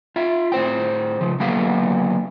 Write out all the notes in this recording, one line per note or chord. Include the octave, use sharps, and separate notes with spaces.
F4 E5
A2 C5 G5
C#3 F3
D3 F#3 A#3 B3 G4 F5